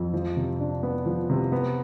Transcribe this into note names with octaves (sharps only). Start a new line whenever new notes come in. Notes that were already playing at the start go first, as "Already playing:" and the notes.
Already playing: F2
F3
C3
D4
B3
F3
C3
B3